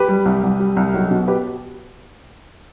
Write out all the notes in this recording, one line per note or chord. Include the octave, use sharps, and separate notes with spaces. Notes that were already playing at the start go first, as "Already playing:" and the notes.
Already playing: G4 B4
G3
C2
C2
G3
C2
B1
B2
G4 B4